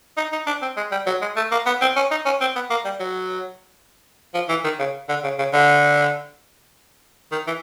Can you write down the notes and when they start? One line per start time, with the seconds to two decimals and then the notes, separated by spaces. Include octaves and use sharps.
0.17 D#4
0.32 D#4
0.47 D4
0.62 C4
0.77 G#3
0.91 G3
1.07 F#3
1.22 G#3
1.36 A3
1.51 A#3
1.66 B3
1.81 C4
1.96 C#4
2.11 D#4
2.26 C#4
2.41 C4
2.56 B3
2.70 A#3
2.85 G3
3.00 F#3
4.34 F3
4.49 E3
4.64 D#3
4.79 C#3
5.09 D3
5.24 C#3
5.39 C#3
5.53 D3
7.32 D#3
7.47 E3